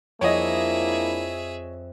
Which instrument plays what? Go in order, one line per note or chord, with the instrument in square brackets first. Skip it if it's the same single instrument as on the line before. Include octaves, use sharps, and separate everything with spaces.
[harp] F2 [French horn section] A#3 D4 E4 [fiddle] G#4 E5 [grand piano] C#5 D#5